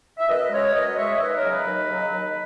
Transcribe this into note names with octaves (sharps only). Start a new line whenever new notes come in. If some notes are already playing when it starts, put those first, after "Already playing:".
E5
F#2 B4 D#5
C#3 G#3 A#4 C#5
F#2 B4 D#5
C#3 G#3 C#5 E5
C#5
D#2 B4 D#5
A#4 C#5
C#3 F#3
B4 D#5
D#2
C#3 F#3
D#2